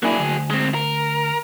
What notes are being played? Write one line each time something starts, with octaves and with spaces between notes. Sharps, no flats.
F#3 A#3 D4 E4 G#4
D2
G#3 C4
A#4